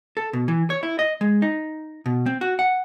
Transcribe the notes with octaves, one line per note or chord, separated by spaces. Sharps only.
A4
B2
E3
C#5
E4
D#5
G#3
D#4
B2
C4
F#4
F#5